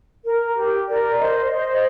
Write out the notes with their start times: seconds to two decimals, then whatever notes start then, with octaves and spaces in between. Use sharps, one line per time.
0.24 A#4
0.55 G4
0.87 A#4 D5
1.18 C5 D#5
1.45 D5
1.50 C5 D#5
1.69 D#5